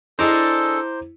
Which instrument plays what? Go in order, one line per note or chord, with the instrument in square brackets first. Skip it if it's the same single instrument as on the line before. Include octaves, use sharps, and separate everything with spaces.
[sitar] G#3 D4 [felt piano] E4 [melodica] A4 [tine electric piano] C5 A#5 D6